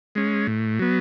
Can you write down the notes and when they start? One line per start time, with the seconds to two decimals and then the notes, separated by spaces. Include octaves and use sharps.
0.15 G#3 C#4
0.47 A2
0.79 F#3 B3